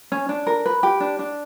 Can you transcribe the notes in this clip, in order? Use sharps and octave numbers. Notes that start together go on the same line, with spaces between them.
C#4
D4
A#4
B4
G4
D4
D4